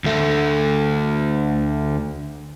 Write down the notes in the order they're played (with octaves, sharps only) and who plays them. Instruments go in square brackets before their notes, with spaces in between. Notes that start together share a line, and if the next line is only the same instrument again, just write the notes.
[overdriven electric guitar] D2 A3